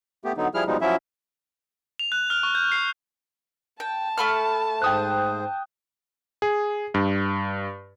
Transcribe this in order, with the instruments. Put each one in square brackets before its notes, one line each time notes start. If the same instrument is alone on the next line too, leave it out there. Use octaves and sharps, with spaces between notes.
[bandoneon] A3 B3 G4
D3 F#3 B3 D#4
F3 G3 E4 G#4 F6
B2 F3 G3 G#3 D#4
F3 F#3 C#4 E4 E5
[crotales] F7
F#6
F6
C#6
G6
C7
[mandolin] G5 [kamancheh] A5
[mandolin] A3 B5 F6
[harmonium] G#2 C5 [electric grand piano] G5 D#6 F#6
[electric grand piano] G#4
G2